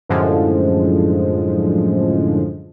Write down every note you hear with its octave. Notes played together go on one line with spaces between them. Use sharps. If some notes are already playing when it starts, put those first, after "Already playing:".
F#2 A2 D3 F3 G#3